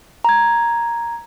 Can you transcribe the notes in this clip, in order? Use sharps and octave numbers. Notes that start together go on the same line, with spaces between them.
A#5 G#6